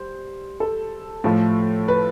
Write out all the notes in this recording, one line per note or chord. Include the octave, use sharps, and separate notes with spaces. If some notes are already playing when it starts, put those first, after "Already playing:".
Already playing: G3 C5
A4
A2 F3 A3
B4